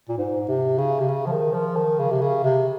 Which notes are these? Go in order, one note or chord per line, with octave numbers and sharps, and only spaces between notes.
A#2
G#2
C3
C#3
C3
C#3
F3
D#3
F3
D#3
C#3
C3
C#3
C3